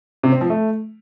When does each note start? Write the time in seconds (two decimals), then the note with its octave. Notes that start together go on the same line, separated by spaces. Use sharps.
0.23 C3
0.32 C4
0.41 F3
0.50 A3